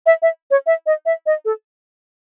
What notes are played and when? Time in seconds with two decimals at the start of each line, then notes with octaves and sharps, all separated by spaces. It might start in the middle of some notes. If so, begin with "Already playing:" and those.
0.06 E5
0.22 E5
0.51 C#5
0.66 E5
0.86 D#5
1.06 E5
1.26 D#5
1.45 A4